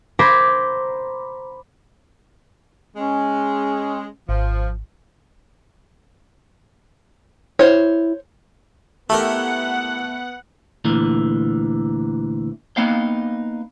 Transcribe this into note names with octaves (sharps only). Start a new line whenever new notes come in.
C5 A#5 B5 D6 G6 G#6
G#3 C#4
G#1 F3
E4 C5 C#5
A3 B3 E4 G4 A#4 F#5
D2 A#2 D3 E3
A#3 B3 D#4 F5 G5